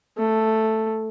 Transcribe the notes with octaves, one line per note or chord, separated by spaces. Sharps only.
A3